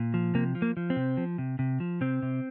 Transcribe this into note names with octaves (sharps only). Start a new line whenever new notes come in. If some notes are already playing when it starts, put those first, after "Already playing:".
Already playing: A#2
F3
C3 A#3
F3
A#3
F3
C4
C3
F3
C3
C3
F3
C3 C4
C3